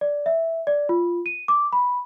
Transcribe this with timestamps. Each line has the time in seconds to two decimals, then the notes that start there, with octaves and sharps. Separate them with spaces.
0.01 D5
0.26 E5
0.67 D5
0.89 F4
1.26 D#7
1.48 D6
1.72 B5